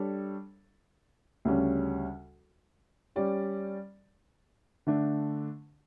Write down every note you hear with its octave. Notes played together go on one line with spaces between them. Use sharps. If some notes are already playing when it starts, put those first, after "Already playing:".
Already playing: G3 D4 A4 C#5
D2 C#3 G3 C#4
G3 C#4 G4 D5
D3 A3 D4